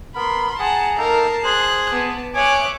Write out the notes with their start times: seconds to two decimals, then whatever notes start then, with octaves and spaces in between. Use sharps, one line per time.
0.15 B3 A#4 B5 C6
0.59 G#4 F#5 A5 A#5
0.98 A#3 D#4 A4 A#4 A5 C7
1.44 G#4 C5 F#6
1.92 B3 A5 D6
2.35 C#5 E5 G#5 D6 D#6 F#6